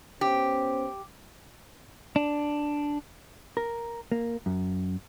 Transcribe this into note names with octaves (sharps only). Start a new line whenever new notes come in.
B3 C#4 G4 C5
D4
A#4
A#3
F#2